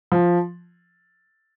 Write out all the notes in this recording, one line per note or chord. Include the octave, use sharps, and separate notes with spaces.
F3